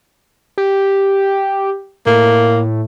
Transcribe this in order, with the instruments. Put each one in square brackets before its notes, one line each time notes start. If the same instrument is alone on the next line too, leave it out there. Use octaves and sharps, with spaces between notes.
[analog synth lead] G4
[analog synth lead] A2 [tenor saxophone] A#3